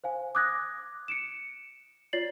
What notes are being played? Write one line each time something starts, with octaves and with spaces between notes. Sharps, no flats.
C5 F5 G#5
D6 D#6 F#6 G#6 A#6
C#7 D7 E7
F4 C#5 D5 A6 C7 F#7